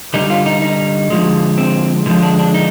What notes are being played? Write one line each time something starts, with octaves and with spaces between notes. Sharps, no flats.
D3 G3 D#4
F4
D#4
D#4
D3 F3 G#3
C4
D3 F3 G#3
D4
D4
D#4